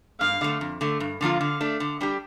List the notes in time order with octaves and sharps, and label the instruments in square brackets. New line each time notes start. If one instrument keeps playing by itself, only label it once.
[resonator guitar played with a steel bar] G2 [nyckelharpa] F5
[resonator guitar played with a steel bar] D3 A3
F2
D3 A3
G2
D3 F3 A#3 F4
[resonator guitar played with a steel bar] D3 [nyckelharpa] F5
[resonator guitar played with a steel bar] A3 D4
D3
G3 D4 G4